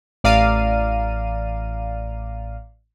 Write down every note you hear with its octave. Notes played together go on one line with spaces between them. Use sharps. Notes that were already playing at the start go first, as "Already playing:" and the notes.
A1 D5 F5 A#5 D#7